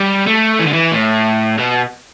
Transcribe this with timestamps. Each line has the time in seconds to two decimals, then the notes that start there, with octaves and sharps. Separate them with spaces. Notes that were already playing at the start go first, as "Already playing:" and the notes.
Already playing: G3
0.27 A3
0.60 E3
0.67 D3
0.74 E3
0.93 A2
1.58 B2